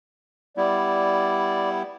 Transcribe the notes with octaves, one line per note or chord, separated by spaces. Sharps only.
G3 B3 E4 D5